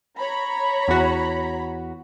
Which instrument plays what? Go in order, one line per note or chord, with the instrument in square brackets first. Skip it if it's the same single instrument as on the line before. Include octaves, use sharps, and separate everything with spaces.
[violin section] C#5 A#5 B5
[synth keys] E2 F#4